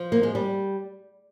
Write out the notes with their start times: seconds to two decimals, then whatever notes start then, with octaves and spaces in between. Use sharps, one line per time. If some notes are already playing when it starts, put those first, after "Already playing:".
Already playing: F3
0.12 A#3
0.23 G#3
0.35 G3